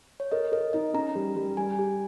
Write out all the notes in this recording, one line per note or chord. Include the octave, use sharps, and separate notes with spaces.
C#5
A#4 D#5
A#4 D#5
D#4 D#5
C#4 A#5
G3
G3
G3 G#5
G4